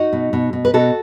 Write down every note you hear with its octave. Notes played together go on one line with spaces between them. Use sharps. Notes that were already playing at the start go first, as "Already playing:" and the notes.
Already playing: D#4 F#4
B2
B2
B2
B4
B2 F#4 A4